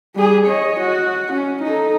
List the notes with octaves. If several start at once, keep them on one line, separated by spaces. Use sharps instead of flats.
G3 G#4
C#5 D#5
F#4
C#4
D#4 A4